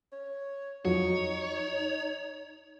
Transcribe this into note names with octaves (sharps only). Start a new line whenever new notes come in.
C#5
F2 F#3 D#4 C#5